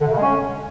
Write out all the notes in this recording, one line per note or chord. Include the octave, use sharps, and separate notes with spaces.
D3
C3
C#3
G#3
C#4